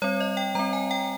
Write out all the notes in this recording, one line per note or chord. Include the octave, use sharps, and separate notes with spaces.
G3 C4 C#5
D#5
G5
G3 C4 A#5
G#5
G5